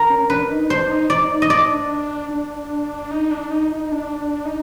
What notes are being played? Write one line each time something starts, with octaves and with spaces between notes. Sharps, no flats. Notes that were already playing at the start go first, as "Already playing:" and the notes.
Already playing: A#4
C#4
D4 B4
D#4
D4 C5
D#4
D#4 D5
D#4
D#5
D4 D5
D4
D#4
D4
D#4
D#4
D4
D4
D#4